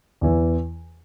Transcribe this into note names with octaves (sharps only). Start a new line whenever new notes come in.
E2 E3